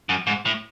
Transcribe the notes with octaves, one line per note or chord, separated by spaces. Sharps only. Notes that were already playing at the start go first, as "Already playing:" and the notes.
F#2
G#2
A2